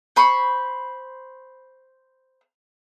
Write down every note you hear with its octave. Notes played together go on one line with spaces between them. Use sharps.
C5 B5 C#6